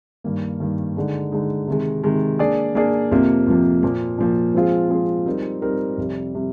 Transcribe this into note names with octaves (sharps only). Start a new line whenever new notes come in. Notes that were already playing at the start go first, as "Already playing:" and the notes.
G2 D#3 A#3
G2 D#3 A#3
D3 G#3 D#4
D3 G#3 D#4
C3 D#3 G#3
C3 D#3 G#3
A#3 D4 G#4 D5
A#3 D4 G#4 D5
F2 C3 F3 A#3
F2 C3 F3 A#3
A#2 F3 A#3
A#2 F3 A#3
F3 G#3 C4 F4 G#4
F3 G#3 C4 F4 G#4
G3 C4 D#4 A#4
G3 C4 D#4 A#4
F2 C3 G3
C3 G3